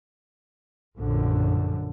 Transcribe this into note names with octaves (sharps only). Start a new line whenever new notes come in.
A#1 F#2 D3